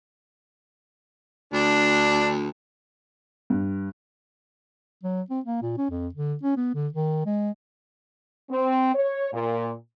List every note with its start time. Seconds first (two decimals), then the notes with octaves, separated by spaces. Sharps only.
1.53 D2 D4
3.50 G2
5.03 F#3
5.30 C4
5.46 A#3
5.62 A#2
5.78 C#4
5.91 F2
6.15 D3
6.43 C#4
6.57 B3
6.75 D3
6.93 D#3
7.26 G#3
8.50 C4
8.94 C#5
9.32 A#2